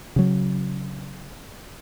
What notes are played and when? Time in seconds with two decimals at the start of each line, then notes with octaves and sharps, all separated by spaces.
0.16 C#3 F#3